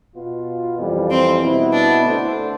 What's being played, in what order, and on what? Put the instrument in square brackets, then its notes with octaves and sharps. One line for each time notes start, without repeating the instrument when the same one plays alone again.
[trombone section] B2 B3 F4
F2 E3 G3
[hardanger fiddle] C4
[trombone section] B2 B3 E4 B4
[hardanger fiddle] D4
[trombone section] D3 A3 D4 A4 C5